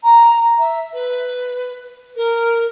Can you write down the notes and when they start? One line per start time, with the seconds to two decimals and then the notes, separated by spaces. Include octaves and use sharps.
0.03 A#5
0.59 E5
0.94 B4
2.16 A#4